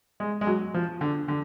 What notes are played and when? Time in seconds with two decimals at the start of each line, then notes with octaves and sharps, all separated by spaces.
0.20 G#3
0.41 G#3
0.47 F#3
0.74 F3
1.01 D3
1.28 D3